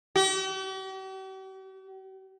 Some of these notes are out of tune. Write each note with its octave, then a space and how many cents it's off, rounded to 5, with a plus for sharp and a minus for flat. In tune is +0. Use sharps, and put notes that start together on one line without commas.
G4 -45